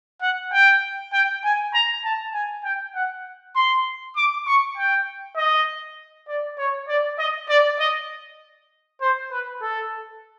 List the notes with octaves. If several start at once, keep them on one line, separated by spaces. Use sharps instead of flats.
F#5
G5
G5
G#5
A#5
A5
G#5
G5
F#5
C6
D6
C#6
G5
D#5
D5
C#5
D5
D#5
D5
D#5
C5
B4
A4